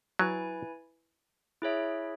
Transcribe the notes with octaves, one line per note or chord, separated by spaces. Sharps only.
F#3 E4 B4 G#5
E4 G#4 C#5 E5